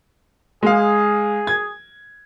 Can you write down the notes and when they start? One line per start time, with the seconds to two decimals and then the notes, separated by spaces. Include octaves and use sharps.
0.63 G#3 G#4 F5
1.47 G#6